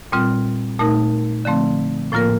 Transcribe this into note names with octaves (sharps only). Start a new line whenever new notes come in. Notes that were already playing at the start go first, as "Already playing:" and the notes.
A#2 G3 C4 F4
A#2 A3 D#4 A#4
D3 F3 A3 C4
A2 F3 A#3 F4 A#4